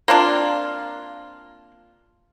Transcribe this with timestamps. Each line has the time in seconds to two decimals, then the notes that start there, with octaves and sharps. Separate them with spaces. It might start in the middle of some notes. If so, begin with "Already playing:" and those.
0.08 A#3 C4 D4 F4